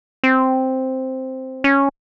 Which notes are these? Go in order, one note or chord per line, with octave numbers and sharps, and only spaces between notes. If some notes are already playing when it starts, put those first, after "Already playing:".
C4
C#4